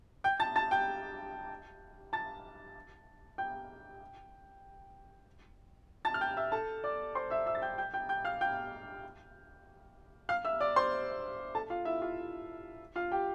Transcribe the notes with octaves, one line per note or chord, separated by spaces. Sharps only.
G5 G6
A5 A6
A5 A6
G5 G6
A5 A6
G5 G6
A5 A6
F6
G5 G6
E5 E6
A4 A5
D5 D6
C5 C6
E5 E6
E5 E6
A6
G5 G6
G5 G6
G5 G6
G5 G6
F5 F6
G5 G6
F5 F6
E5 E6
D5 D6
C5 C6
A4 A5
F4 F5
E4 E5
F4 F5
F4 F5
G4 G5